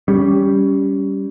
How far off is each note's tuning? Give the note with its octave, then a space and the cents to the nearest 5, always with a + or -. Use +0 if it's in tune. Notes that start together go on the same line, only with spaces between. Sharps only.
G3 +0 C#4 +15